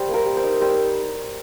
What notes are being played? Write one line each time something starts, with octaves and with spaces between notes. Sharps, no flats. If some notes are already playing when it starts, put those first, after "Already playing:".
Already playing: G3 C5
A#3
A#4
G3
C5
D#4
G3 C5